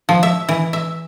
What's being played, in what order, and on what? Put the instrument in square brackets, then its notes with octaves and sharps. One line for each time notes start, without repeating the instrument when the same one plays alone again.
[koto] F3
E5
E3
E5